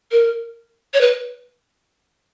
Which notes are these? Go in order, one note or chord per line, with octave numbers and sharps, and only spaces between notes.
A#4
C#5
B4